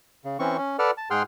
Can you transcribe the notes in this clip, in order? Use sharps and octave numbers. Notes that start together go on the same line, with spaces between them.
C#3
E3 C4 C#4 C#6
C#4
A4 B4 D5 F#5 F6
A5
G#2 G#4 F#5 G5 C6 F6